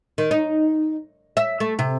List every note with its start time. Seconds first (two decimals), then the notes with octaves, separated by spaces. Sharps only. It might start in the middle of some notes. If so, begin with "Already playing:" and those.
0.18 D#3
0.31 D#4
1.37 E5
1.60 A3
1.79 C3